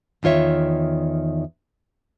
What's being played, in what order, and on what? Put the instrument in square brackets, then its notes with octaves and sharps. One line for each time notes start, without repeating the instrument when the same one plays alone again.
[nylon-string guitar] E2 D#3 F4 C#5 E5